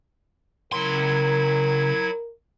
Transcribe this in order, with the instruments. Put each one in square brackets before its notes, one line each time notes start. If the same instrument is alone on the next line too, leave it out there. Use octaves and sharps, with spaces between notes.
[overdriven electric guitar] C#3 C6 [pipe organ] F#3 E4 G#6 [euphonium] A#4